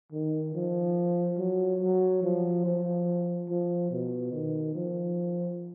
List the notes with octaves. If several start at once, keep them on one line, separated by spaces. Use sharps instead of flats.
D#3
F3
F#3
F#3
F3
F3
F3
B2
D#3
F3